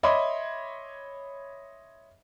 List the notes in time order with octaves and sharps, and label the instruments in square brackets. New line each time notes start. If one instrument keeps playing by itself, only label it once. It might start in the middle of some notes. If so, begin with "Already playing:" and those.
[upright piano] C#5 D#5 E5 B5 C6 D6